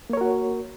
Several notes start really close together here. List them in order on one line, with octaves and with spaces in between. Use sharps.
A#3 C#5 A#4 F#4